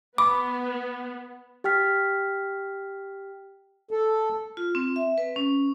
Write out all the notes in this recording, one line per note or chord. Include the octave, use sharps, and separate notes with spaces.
B3 B5 D6
G4 G5 F6 B6
A4
F4
C4
E5
B4
C#4